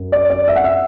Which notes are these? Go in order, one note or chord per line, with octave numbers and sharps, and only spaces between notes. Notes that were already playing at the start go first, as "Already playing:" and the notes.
Already playing: F#2 F#3
D5
D5
E5
F#5
E5